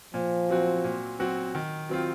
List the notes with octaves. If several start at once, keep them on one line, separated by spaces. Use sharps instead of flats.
A#2 F3
F#3 C4 F#4
A#2
F#3 C4 F#4
D#3
F#3 C4 F4